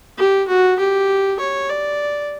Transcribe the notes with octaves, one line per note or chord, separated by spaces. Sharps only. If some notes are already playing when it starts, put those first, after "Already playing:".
G4
F#4
G4
C#5
D5